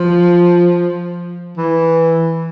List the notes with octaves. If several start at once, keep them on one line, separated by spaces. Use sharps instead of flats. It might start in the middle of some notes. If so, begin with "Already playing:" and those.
Already playing: F3
E3